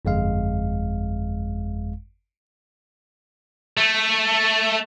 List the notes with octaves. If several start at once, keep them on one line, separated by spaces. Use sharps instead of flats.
G1 F2 G#3 F5
A3